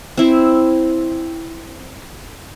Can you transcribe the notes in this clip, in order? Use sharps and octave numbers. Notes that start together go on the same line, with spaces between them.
C4 E4